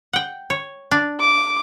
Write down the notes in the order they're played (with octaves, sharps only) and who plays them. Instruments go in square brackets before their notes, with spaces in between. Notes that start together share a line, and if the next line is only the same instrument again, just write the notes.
[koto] F#5 G5
C#5
D4
[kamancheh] D6